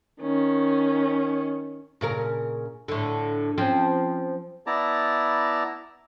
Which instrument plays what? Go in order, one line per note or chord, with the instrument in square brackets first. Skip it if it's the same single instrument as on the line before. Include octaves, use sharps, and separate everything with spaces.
[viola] D#3 C#4
[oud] A#2 C#3 A#4
A2 D3
F3 C4 C#4
[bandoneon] B3 E4 D5 A5 A#5